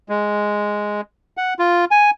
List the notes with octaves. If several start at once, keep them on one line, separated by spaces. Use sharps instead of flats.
G#3
F#5
F4
G#5